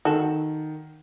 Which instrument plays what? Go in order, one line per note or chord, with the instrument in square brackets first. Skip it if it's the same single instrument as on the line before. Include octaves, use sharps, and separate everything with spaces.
[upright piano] D#3 [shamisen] F#4 A4